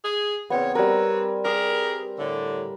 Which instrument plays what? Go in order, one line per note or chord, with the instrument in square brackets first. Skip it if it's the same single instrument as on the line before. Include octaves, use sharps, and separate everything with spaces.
[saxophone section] G#4
[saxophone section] E2 C#3 C#5 [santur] B3 C4
[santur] G3 A#4 [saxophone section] C4 B4 C#5
[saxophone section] G4 G#4 A#4 [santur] E6
[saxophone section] A2 D3